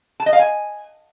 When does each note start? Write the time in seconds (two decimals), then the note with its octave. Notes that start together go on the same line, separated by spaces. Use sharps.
0.20 A5
0.26 D#5
0.33 F5
0.39 G#5